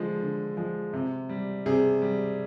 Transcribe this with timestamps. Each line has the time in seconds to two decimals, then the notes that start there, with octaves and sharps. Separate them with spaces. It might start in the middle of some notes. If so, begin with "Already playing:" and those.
Already playing: D3 F3 G#3
0.21 D3
0.57 F3 G#3
0.93 C3
1.29 G3
1.66 C3 G#4
2.02 G3